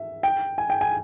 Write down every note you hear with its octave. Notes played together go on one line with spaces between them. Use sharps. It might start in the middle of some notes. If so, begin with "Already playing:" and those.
Already playing: E5
G5
G#5
G5
G#5